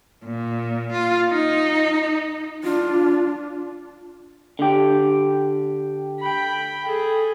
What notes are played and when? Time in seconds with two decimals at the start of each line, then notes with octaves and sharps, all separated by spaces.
0.24 A#2
0.92 F4
1.29 D#4
2.64 D4 F4
4.59 D3 G4
6.20 G5 B5
6.87 G#4 A4